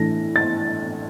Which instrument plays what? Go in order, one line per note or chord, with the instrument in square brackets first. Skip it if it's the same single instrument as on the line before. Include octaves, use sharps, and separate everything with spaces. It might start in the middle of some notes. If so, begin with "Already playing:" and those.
Already playing: [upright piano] A2 E3 A3 D4 A#6
A6